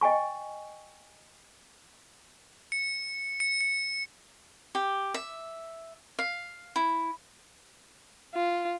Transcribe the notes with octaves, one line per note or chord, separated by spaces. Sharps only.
D#5 G5 G#5 C#6
C#7
C#7
C#7
G4
E5
F5
E4
F4